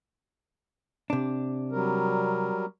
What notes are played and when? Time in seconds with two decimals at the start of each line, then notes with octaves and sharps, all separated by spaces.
1.10 C3 D4
1.72 F#3 G3 A#4